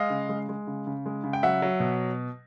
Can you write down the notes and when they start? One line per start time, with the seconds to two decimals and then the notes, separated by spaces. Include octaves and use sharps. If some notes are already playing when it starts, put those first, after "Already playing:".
Already playing: G#3 D#5 F5
0.10 C#3
0.29 G#3
0.49 G#3
0.67 C#3
0.87 C#3
1.06 G#3
1.24 C#3
1.33 G5
1.43 F#3 E5 F#5
1.62 F#3
1.80 B2